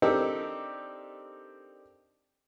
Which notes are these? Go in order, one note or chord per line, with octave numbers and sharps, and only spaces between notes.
C4 D4 D#4 G4 A4 A#4